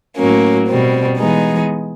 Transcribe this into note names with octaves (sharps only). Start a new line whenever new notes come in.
A2 F#3 A#3 C#4
B2 G3 C4
E3 G#3 B3 D#4 G#4